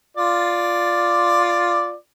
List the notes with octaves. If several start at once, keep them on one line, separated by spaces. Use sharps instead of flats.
F4 D5